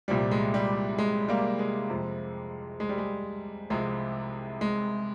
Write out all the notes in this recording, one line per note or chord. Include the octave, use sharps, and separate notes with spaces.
C2 A#2 F3 G3
G#3
G3
G#3
G3 A#3
G#3
F2 C3 F3
G#3
G3
G#3
C2 C3 F3 G#3
G#3